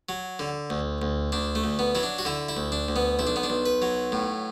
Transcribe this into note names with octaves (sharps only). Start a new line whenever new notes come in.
F#3
D3
D2
D2
D2 D4
A3
D2
B3
F#3 E4
D4
F#4
D3 E4
E4
D2
D4
D2
B3
B1 E4
D4
B3
D4
B1
B4
F#3
A2